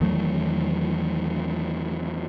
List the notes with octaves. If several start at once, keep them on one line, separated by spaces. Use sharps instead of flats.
E2 D#3 F#3 A3